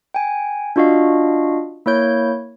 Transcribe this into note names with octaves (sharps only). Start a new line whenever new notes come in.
G5 G#5
D4 F4 F#4 D#5 F5
A#3 E4 C#5 G6